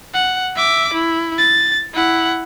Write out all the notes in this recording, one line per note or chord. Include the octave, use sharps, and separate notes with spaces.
F#5
E5 D6
E4
A6
E4 F#5